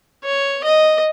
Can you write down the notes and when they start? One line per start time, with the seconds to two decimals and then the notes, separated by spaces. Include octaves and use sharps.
0.25 C#5
0.64 D#5